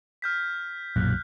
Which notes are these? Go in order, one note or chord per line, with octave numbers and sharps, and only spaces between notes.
F6 G6 B6
B1 F#2 A#2 F#6